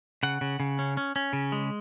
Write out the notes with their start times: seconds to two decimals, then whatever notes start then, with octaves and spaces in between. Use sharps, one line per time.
0.23 C#3 F#5
0.41 C#3
0.60 C#3
0.79 C#4
0.97 C#4
1.16 C#4
1.33 C#3
1.52 G#3